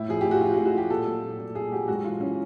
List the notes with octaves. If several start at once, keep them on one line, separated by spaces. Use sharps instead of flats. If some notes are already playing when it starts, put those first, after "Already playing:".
Already playing: A2 E4
F3 G#4
A2 G4
F#4
F3 F4
F#4
A2
F#4
F3 G4
A#2 A4
F#3
A#2
A#2
A#2 G#4
F#3 G4
G#2 F#4
E3 F4
E3 C#4